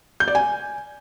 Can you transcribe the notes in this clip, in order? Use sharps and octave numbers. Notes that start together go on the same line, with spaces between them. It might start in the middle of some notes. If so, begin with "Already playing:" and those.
G6
D5
G#5